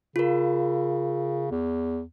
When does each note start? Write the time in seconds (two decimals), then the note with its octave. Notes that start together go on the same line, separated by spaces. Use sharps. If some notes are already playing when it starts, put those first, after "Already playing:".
0.16 C#3 F4 A#4
1.51 E2